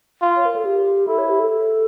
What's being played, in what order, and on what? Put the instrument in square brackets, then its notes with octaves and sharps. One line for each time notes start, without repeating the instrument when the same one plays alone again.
[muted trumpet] F4
[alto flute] C#5
A#4
A4
G4
[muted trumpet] E4 [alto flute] A4
[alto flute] C#5
G4
A4